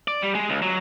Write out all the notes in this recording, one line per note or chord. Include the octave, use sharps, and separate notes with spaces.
D5
G3
G#3
C#2
F#3